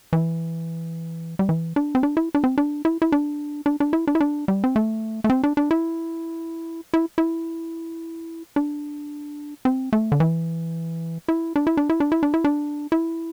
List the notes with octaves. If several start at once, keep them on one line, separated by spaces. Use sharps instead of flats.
E3
G3
E3
D4
C4
D4
E4
D4
C4
D4
E4
E4
D4
D4
D4
E4
D4
E4
D4
G3
C4
A3
A3
C4
D4
D4
E4
E4
E4
D4
C4
A3
D3
E3
E4
D4
E4
D4
E4
D4
E4
D4
E4
D4
E4